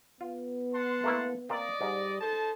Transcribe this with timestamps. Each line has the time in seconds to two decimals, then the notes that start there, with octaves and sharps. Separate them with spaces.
0.21 B3 F4
0.74 F#5 A5 C6
1.04 A3 A#3 E4
1.49 A#3 C4 D5 D#5
1.81 G#2 G3
2.21 D#4 A4 C5 A5